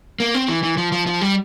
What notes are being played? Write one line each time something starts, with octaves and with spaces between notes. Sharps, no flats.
A#3
C4
E3
E3
F3
F3
F3
G3